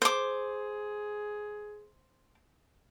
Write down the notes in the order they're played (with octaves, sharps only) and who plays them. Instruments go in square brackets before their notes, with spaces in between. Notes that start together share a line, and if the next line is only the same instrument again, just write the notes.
[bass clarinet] G#4 [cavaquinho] C5 D6